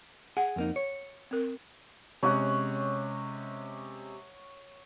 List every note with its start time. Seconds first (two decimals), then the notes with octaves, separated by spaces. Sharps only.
0.37 G#4 F#5
0.56 F2 A#3 D#4
0.76 C#5
1.31 C4 A#4
2.23 C3 G#3 C#4 C#5 F#5